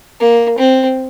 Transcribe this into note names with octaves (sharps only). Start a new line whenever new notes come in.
A#3
C4